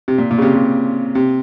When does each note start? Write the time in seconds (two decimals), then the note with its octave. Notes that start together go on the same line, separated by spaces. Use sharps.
0.08 C3
0.18 A#2
0.31 A#2
0.38 C#3
0.42 C3
0.55 C3
1.15 C3